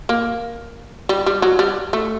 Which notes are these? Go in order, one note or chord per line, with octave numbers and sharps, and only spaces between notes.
A#3
G3
G3
F#3
G3
A3